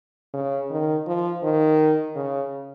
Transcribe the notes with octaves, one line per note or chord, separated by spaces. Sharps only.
C#3
D#3
F3
D#3
C#3